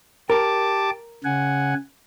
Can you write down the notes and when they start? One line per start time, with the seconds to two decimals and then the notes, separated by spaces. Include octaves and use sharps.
0.30 G4 A#4 A5 D6
1.24 C#3 F#5 G#5